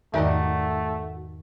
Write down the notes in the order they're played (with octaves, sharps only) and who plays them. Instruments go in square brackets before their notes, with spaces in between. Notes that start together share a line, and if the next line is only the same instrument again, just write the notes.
[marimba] E2 G#2 [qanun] D#3 [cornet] A3 [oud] F#4 D5 D#5